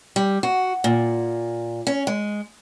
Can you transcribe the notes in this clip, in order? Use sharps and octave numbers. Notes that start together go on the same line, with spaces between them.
G3
F#4
A#2
C#4
G#3